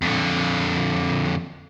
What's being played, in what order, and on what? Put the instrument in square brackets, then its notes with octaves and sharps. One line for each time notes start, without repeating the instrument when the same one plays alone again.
[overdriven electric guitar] F2 D3